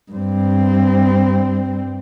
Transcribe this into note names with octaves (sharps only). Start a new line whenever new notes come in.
G2 C4